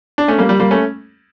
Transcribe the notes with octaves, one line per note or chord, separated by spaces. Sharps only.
D4
A3 C#4
G3 A#3
G3
G3 A#3
A3 C#4